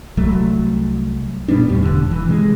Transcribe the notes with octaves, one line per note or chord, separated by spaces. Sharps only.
C2 F#3 A3
A#2 G3 B3 D4
E2 A2 G3
E1 D#2 D3
E3
C3 G#3